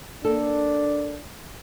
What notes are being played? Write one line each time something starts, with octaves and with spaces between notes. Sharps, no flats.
A#3 D4 A4